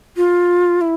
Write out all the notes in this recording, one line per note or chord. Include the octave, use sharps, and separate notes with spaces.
F4
E4